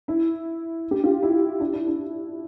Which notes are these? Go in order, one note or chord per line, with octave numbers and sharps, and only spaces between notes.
E4
G4
F4
E4
D4
E4
D4